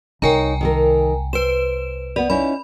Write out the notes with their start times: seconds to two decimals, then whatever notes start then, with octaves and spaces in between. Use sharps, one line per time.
0.22 C2 D#4 A#4 C#5 G5 G#5 A#5
0.61 D#3 A4 A#4
1.33 B4 C5 E7
2.16 B3 B4 D5
2.30 C#4 D#4 E4 B5